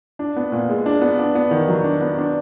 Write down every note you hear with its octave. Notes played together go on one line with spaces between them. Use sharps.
D4
B3
A#2
G#3
D4
B3
D4
B3
D#3
F#3
D4
B3
D4